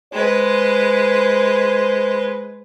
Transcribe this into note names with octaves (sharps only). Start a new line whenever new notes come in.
G#3 B4 C5